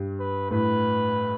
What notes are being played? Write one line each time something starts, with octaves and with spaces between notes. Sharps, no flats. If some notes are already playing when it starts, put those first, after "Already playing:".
Already playing: G2
B4
A2 B4